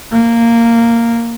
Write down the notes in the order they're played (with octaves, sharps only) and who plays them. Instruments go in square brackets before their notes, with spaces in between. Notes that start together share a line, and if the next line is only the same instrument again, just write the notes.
[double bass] A#3